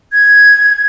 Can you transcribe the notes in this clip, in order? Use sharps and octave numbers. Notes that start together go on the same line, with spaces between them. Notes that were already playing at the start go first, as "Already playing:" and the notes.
G#6